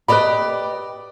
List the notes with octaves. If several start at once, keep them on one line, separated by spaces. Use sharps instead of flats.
G4 B4 D5 D#5 B5